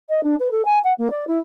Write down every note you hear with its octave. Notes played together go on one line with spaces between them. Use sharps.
D#5
D4
B4
A4
G#5
F#5
A#3
D5
E4